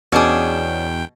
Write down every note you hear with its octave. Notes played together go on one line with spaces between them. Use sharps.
E2 B2 C#4 D4 G#4 G5